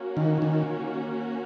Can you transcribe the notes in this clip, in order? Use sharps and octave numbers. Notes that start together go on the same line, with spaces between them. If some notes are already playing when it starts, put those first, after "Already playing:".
Already playing: A#3 C#4 F#4
D#3
D#3